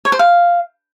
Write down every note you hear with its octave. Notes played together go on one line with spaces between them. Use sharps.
C#5
C5
F5